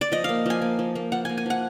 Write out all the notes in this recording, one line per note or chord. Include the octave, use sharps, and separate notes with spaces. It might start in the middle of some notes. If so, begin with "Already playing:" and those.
D5
F3 D#5
A#3 F5
F3 G#5
A#3
F3
A#3
F3 F#5
A#3 G#5
G#5
F3 F#5